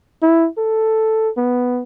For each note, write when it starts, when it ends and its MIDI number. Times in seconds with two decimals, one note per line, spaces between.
0.22 0.47 64
0.58 1.29 69
1.37 1.82 59